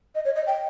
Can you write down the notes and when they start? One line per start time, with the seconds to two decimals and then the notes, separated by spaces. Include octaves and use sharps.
0.15 D#5
0.25 C#5
0.36 D#5
0.47 G5